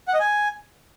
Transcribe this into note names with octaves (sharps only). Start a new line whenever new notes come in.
F#5
D#5
G#5